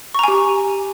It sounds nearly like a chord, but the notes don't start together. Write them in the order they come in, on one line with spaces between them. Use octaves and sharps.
C#6 A#5 G#5 G4